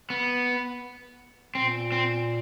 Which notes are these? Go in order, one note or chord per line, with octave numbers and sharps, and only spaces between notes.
B3
A#2 C4
C4